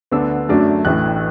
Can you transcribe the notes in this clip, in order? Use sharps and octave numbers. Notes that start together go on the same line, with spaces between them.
D2 D3 B3 D4 E6
F#2 F#3 A3 D4
A1 A2 E3 F#6